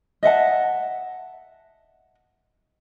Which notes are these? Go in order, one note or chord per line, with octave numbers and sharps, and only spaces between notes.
D#5 E5 F#5 A5